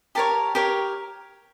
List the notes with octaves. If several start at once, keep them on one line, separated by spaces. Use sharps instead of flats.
G4 A#4 C#5 A5
G4 A#4 C#5